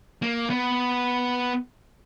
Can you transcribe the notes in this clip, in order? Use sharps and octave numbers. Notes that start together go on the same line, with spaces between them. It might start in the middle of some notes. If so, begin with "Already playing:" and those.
A#3
B3